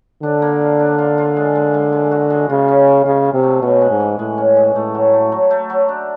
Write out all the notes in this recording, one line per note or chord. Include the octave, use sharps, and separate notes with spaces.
D3 D4
A#3
F4
D4
F4
F4
G#3
G#3
G#3
G#3
F#4
G#3
C#3 F4
C#4
F4
C#3 F4
F4
C3
A3
B2 C#4
G#3
G#2
E3
A2 G#3
C#4
G#3
A2 A3
F#3
A3
F#3
A3
F#3
D4